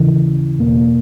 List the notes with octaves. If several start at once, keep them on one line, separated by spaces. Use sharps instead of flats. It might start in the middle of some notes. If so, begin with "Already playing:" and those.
Already playing: D#2 C#3 E3
E2 B2 A#3